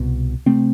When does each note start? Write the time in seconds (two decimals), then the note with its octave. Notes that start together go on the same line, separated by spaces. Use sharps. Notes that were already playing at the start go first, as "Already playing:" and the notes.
Already playing: C2 B2
0.46 C3 A3 C4